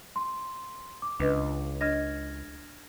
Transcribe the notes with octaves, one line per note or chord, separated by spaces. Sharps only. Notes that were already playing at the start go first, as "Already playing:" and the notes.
C6
D6
C#2 D4 B4 D#5
D4 D#5 F6 G#6 A#6